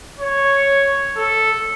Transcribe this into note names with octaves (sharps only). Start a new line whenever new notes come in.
C#5
A4